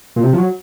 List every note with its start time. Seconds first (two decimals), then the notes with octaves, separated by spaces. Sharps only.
0.16 A#2
0.24 C3
0.33 F3
0.38 F#3